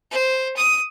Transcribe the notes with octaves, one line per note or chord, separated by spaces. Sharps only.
C5
D#6